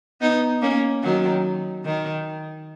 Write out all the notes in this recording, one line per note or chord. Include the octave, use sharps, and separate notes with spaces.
B3 D#4
A#3 C#4
D#3 F#3
D#3